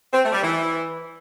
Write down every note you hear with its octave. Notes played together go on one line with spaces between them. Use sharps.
C4
A3
G3
E3